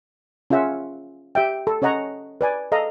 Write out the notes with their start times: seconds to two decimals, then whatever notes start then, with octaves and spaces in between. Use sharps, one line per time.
0.50 C#4 F4 G#4 E5 F#5
1.35 G4 E5 G5
1.67 A4
1.82 C#4 C#5 D#5 F#5 A#5 C#6
2.41 B4 D5 G#5
2.72 A4 D#5 F5 A#5